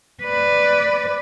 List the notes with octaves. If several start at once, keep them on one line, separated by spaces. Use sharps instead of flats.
B4 D5